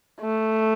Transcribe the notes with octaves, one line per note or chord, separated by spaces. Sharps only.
A3